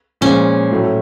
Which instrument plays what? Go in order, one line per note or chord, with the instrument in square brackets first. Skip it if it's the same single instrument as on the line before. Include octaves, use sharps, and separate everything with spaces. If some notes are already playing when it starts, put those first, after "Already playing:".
[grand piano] A#2 F3 G#3 [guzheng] C#4
[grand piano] A2 F#3 A3